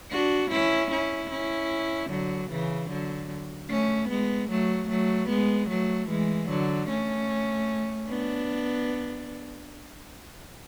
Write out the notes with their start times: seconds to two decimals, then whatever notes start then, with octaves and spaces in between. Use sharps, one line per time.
0.12 D4 F#4
0.51 C#4 E4
0.92 C#4 E4
1.31 C#4 E4
2.10 D3 F#3
2.51 C#3 E3
2.90 D3 F#3
3.70 A3 C#4
4.10 G#3 B3
4.50 F#3 A3
4.90 F#3 A3
5.29 G#3 B3
5.69 F#3 A3
6.09 E3 G#3
6.49 D3 F#3
6.89 A3 C#4
8.09 B3 D4